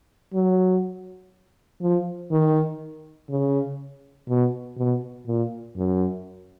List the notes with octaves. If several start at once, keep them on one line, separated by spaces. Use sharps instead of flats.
F#3
F3
D#3
C#3
B2
B2
A#2
F#2